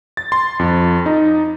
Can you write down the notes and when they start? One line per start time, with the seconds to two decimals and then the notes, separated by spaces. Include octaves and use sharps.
0.17 A6
0.32 C6
0.59 F2
1.06 D#4